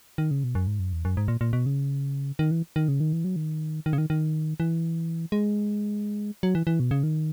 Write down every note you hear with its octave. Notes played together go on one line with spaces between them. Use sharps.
D#3
C#3
B2
F#2
G#2
F#2
E2
F#2
G#2
A#2
A#2
B2
C#3
D#3
E3
D#3
C#3
D#3
E3
F#3
D#3
D#3
C#3
D#3
D#3
E3
G#3
F#3
E3
E3
B2
C#3
D#3